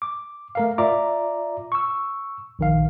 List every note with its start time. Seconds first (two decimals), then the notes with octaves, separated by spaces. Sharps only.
0.02 D6
0.55 A3 A#4 F5
0.78 F4 D5 E5 A#5 D6
1.72 C#6 E6
2.59 A#1 D#3 F5